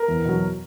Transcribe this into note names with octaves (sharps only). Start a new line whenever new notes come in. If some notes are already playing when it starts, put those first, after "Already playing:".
Already playing: A#4
E2
B2 F#3